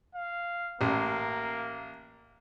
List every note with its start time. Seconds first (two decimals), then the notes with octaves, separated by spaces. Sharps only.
0.15 F5
0.81 A1 A#3